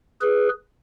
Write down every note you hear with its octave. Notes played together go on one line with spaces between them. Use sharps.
G#4 B4